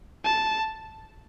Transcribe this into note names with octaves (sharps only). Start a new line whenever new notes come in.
A5